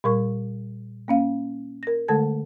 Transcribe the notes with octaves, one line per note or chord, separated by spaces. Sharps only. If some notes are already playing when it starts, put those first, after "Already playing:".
A#2 G3 A#4 C#6
A#3 C#4 F5
A#4 A#6
D3 G#3 A3 A4 A5 G#6